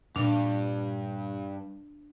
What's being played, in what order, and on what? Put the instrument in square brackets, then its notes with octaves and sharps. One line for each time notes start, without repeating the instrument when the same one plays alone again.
[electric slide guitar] G2 [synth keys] A#2 [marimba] D4